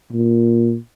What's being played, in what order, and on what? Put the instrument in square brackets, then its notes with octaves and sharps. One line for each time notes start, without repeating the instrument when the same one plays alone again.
[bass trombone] A#2